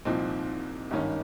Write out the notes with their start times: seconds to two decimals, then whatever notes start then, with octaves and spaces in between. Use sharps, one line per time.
0.05 C2 A#2 F3 C4 D#4
0.91 G#1 G2 D#3 A#3 C#4